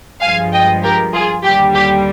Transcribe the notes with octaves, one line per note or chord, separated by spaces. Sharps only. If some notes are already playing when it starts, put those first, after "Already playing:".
G2 F3 G#3 F5 G#5
D#5 G5
G4 A#4
F4 G#4
D#2 D3 G3 G4
G4